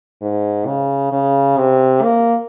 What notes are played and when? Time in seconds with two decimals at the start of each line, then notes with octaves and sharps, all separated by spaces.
0.21 G#2
0.67 C#3
1.12 C#3
1.58 C3
2.03 A#3